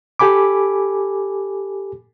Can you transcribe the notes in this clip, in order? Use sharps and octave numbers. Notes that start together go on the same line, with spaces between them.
G4 A4 G#5 B5 D6